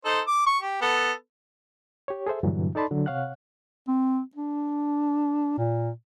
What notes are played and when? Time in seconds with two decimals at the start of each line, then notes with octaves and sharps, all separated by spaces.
0.05 D#4 A4 C5
0.27 D6
0.46 C#6
0.61 G4
0.82 B3 A4
2.08 G4 C#5
2.27 G#4 A4 C5 E5
2.43 G2 A#2 D3 E3 F#3
2.75 D#4 A4 D5 A5 B5 C6
2.91 D3 F#3
3.06 C3 C#5 F5 F#5 F#6
3.88 C4
4.35 D4
5.58 A#2